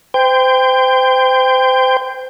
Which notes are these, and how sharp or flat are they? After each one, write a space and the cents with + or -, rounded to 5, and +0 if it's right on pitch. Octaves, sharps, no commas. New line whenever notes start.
C5 -30 G5 +15